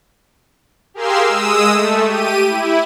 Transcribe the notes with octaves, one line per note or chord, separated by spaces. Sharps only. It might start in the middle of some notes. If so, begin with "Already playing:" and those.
G4 G#4 A#4 F5 C6 E6
G#3 D#6 E6
A3
G4 D#7
E4